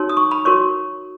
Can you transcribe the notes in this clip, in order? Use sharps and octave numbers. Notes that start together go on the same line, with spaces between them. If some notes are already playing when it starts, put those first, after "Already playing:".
Already playing: D#4 F#4 A#4 C#5
D#6
C#6
B5
F#4 A#4 C#5 C#6